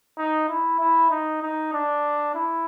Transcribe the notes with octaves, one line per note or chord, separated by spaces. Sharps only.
D#4
E4
E4
D#4
D#4
D4
E4